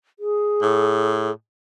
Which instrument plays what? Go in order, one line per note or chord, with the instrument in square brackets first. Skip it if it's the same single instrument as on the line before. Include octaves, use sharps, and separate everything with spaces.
[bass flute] G#4
[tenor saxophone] A2